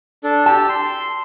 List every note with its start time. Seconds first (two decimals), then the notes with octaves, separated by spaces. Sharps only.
0.24 D4 A4
0.46 G4 A5 E6
0.69 C6